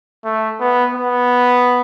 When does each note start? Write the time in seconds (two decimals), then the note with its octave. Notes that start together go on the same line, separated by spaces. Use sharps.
0.24 A3
0.60 B3
0.95 B3